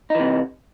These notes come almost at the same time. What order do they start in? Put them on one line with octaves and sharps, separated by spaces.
D#4 E3 C3